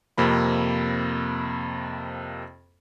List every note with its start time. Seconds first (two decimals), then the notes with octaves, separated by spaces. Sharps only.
0.18 F2 C3 A#3 B5